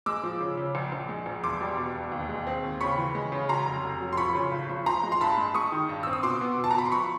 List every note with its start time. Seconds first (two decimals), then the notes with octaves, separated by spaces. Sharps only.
0.06 G#3 D6 E6
0.23 F3
0.41 C#3
0.57 C#3
0.75 A#1
0.92 A#1
1.09 G#3
1.26 A#1
1.43 E1 C6 D6
1.61 G3
1.78 B2
1.95 E1
2.12 D#2
2.29 G#3
2.47 C4
2.64 D#2
2.81 C#3 B5 C#6
2.98 E3
3.15 G#3
3.32 C#3
3.49 F#3 A#5 C6
3.66 F1
3.83 F1
4.01 F#3
4.13 C6
4.17 F3 B5 C#6
4.35 C#3
4.52 G#1
4.69 F3
4.86 F3 A#5 C6
5.03 G#3
5.12 C6
5.21 G2 A5 B5
5.37 G#3
5.54 G#3 C#6 D#6
5.72 D#3
5.89 G2
6.03 C4 E6
6.13 D#6
6.23 B2 C6 D6
6.41 B3
6.58 B2
6.64 A5
6.71 A#5
6.75 B2 B5
6.85 C6
6.92 F3 B5 C#6